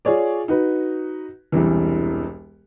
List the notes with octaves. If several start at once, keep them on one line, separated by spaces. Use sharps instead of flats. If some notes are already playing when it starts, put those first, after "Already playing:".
F4 G#4 C#5 D5
D#4 F#4 B4
E1 C2 E3